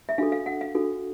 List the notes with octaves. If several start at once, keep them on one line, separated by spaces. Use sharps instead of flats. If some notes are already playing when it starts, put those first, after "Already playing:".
E5
D4 F#4 A4 F5
F5
F#5
F5
D4 F#4 A4